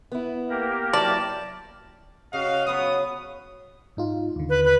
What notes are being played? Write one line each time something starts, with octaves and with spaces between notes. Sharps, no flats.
B3 E4
A#3 G4 A#4
F#3 E4 D5 A5
C#3 F#4 D#5 F5
F#3 B3 F#4 D#6
G#2 D#4 F4
D#2 D3
B4
B4